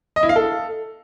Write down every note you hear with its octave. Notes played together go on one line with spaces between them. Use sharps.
D#5
E4
F5
A4